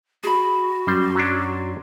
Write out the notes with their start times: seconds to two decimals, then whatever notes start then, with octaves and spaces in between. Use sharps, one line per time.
0.24 F#4 G#4 B5
0.87 F#2 G3 C6
1.15 F#3 C#4 D4